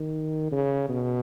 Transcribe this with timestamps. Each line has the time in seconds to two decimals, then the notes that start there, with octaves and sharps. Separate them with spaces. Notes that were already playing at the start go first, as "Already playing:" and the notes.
Already playing: D#3
0.51 C#3
0.89 B2